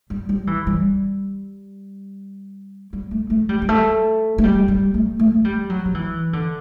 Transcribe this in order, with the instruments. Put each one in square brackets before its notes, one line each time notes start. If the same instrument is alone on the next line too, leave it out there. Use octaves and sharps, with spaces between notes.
[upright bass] G3
G3
E3
G3
G3
A3
A3
G3
G3
A3
A3
G3
G3
A3
A3
A3
G3
F#3
F#3
E3
D3